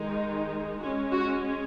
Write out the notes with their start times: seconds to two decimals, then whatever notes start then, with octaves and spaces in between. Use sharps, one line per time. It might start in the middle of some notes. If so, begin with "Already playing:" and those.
Already playing: D#3 G#3 D#4
0.81 G#3 F#4
0.86 C#4
1.13 F#4